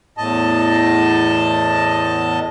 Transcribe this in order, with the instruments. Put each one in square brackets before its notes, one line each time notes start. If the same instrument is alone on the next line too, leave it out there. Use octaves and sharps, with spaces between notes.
[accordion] E2 A2 D#5 A5